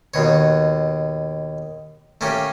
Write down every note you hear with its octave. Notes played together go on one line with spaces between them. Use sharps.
D#2 B2 C#5
A3 A#3 C#4 G4